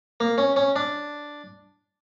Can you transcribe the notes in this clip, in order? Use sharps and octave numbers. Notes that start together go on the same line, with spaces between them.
A#3
C#4
C#4
D4